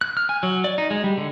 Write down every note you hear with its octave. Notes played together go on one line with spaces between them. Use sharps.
F#6
F6
G#5
F#3
D5
D#4
G#3
G3
D3